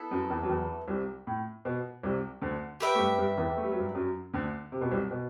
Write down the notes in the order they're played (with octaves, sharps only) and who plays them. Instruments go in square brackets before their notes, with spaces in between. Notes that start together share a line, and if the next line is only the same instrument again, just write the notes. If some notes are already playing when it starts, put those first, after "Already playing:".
Already playing: [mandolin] B3 E4 A4
[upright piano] F#2 F#3
E2 E3
F#3
E2 E3
C2 C3
A2
B2
C2 C3
D2 D3
[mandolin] G4 B4 E5 G5
[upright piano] A3
G2 G3
G2 G3
E2 E3
A3
G3
F#3
G2 G3
F#2 F#3
D2 D3
C3
B2
C2 C3
B2